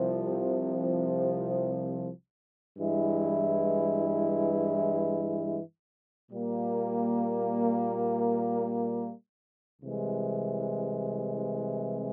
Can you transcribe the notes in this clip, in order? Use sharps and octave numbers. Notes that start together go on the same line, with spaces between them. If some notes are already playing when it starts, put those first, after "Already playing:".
Already playing: C2 C3 F3
G2 E3 G#3 E4
A#2 G3 A#3
C2 C3 E3 G#3